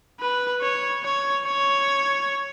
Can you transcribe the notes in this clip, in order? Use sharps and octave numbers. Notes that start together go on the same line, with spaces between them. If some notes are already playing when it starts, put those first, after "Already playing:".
B4
C#5
C#5
C#5